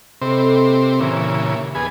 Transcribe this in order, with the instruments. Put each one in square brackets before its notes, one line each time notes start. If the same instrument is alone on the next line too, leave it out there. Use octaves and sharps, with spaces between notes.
[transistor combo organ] C3 C4 [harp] A4 D#5 B5
[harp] A#3 G4
[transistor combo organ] A#2 C#3 E3
[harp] D#2 D6 [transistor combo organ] B3 G#4